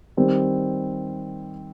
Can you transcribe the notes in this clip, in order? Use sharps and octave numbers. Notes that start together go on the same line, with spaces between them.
D#3 G3 C4